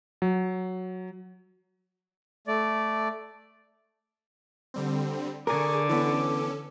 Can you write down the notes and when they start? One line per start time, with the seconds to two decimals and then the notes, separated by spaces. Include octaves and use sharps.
0.22 F#3
2.47 A3 D5
4.74 D3 G3 C4
5.47 D3 G#4 A#4 G#5 C#6 D6
5.89 E3 B3 C#4 A4